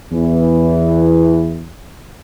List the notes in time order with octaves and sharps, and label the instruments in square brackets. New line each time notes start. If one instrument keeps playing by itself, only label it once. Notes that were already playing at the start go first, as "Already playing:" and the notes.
[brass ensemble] E2 E3